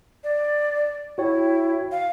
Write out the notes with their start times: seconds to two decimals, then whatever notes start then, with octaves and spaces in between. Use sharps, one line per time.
0.24 D5
1.18 E4 F#4 C#5 G5
1.92 F5